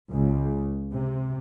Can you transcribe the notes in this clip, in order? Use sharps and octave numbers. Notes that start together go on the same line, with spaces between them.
C#2
C3